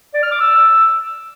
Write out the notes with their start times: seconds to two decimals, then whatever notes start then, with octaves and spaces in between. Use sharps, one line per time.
0.14 D5
0.22 F6
0.31 D6
0.40 E6